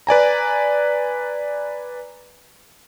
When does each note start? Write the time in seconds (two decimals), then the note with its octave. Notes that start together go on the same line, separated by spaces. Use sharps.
0.07 B4 D5 G#5 A#5